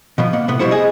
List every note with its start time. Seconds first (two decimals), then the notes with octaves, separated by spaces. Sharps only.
0.18 B2 F3 B3
0.33 A#3 F#5
0.48 A2 C3 B3
0.59 F2 B2 G3 E4 C5 F#5
0.71 G#4 D#5